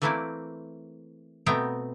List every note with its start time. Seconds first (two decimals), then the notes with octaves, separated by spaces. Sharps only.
0.02 E3 A3 A#3 C4 E4 D5
1.46 B2 A3 B3 C4 G5 A#5